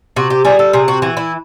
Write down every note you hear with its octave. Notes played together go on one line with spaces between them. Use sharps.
C3 F#4
G4
G3 G#4
A4
C3 G#4
F#4
E3 F#4
E4